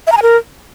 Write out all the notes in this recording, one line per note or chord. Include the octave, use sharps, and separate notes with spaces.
E5
A#5
G#5
A#4